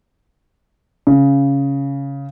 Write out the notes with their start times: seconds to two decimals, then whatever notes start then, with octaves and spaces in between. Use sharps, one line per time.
1.07 C#3